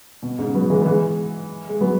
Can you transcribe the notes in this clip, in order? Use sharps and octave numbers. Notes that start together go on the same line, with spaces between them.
B2
G#2 C#3
F#3 B3
E3 G#3
B3
E3 G#3
G#3
F#3 B3